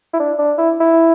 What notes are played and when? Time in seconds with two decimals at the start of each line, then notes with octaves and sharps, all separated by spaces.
0.14 E4
0.20 D4
0.39 D4
0.58 E4
0.80 E4